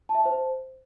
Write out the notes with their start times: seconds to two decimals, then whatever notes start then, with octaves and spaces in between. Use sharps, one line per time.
0.09 A5
0.15 E5
0.20 A5
0.25 C5